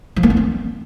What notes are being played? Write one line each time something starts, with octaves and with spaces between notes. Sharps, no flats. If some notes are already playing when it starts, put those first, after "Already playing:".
F3
A#3
C#4
C4